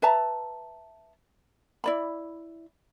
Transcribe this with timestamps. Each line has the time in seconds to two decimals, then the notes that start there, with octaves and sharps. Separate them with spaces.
0.02 B4 E5 A5 A#5
1.84 E4 D5 B5